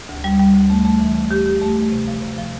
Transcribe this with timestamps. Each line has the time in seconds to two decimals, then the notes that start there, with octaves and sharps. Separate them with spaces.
0.09 D2
0.24 G3
0.40 G3
0.54 D2
0.70 A3
0.85 A3
1.00 E3
1.15 A3
1.31 G4
1.46 G4
1.61 A3
1.77 A3
1.91 C3
2.07 F3
2.22 C3
2.38 F3